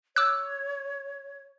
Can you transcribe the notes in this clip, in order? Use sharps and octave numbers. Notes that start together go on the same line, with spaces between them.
C#5 D6 E6 F#6